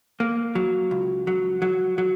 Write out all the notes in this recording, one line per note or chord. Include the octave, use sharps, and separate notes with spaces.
A#3
F#3
C#2
F#3
F#3
F#3